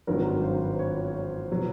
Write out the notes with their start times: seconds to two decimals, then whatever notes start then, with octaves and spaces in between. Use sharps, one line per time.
0.07 G#1 G2 D#3 F#3 A#4
0.43 C5
0.64 B4
0.71 C5
0.79 C#5
1.14 C5
1.50 B2 F#3 B4